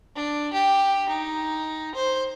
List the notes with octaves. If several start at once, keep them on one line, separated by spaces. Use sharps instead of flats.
D4
G4
D#4
C5